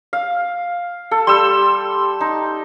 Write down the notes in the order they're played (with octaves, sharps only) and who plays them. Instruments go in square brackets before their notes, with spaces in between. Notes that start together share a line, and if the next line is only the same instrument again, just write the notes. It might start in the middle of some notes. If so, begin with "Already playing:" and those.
[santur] F5
A4
[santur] G3 E6 [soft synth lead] C6
[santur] D#4